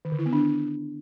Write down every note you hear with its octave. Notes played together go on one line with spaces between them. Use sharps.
D#3
D3
E4
B3
D4